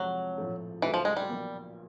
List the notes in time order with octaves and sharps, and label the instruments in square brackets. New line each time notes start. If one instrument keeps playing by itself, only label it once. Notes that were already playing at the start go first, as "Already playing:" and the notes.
Already playing: [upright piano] F2 C3 F3 G#3 [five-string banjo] F#3
[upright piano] A#1 A2 F3 A3
[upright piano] D2 C#3 F#3 A3 [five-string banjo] E3
[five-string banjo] F3
G#3
G3
[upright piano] B1 A#2 F3 A#3